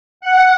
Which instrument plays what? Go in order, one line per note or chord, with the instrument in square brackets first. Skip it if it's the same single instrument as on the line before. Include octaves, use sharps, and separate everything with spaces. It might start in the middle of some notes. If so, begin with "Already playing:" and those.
[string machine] F#5